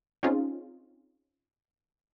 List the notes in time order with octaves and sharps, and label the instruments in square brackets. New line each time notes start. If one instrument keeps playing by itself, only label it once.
[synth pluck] C4 C#4 D#4 F4 G#4